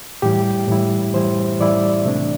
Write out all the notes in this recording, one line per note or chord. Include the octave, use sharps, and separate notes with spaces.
A2 E3 G3 E4 G4
A2 E3 G3 E4
A2 E3 G3 E4 C5
A2 E3 G3 E4 D5
C3 A3 D4